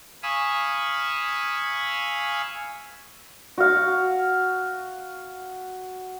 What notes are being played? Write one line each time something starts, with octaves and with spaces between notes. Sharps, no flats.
F5 G#5 B5 C#6 D#6 E6
F#4 F5